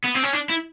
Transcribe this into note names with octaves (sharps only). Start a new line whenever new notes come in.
B3
C4
C#4
D4
E4